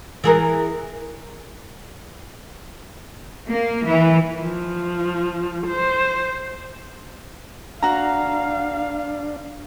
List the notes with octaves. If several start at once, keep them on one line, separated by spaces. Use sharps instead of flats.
E3 G#4 A#4
A#3
E3
F3
C5
D4 F#4 F5 A#5